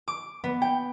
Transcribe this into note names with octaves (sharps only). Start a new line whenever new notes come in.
D6
B3
G5